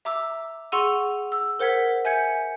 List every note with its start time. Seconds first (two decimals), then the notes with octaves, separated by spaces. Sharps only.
0.05 E5 A#5 D6 E6
0.72 G#4 F#5 C6 C#6 E6 D#7
1.32 E6
1.59 A#4 C5 F#5 G#6 B6
2.05 E5 G#5 G6 G#6 C#7